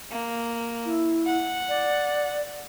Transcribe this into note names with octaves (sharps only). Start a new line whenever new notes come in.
A#3
E4
F#5
D5